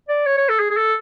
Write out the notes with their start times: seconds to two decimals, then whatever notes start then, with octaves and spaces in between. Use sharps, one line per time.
0.09 D5
0.26 C#5
0.38 C#5
0.49 A4
0.59 G#4
0.71 G#4
0.77 A4